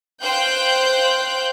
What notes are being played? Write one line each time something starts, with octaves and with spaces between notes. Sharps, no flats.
C5 F5 G5 F#6 G6